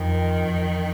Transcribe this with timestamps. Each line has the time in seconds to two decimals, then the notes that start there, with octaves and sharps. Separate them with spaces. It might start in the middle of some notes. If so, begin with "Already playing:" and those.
Already playing: F2 D#3
0.46 F2